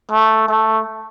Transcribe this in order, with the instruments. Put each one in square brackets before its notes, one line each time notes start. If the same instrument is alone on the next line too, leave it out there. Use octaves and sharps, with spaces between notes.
[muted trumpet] A3
A3